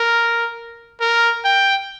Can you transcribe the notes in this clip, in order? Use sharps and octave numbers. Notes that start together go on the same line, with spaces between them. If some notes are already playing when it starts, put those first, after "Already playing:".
Already playing: A#4
A#4
G5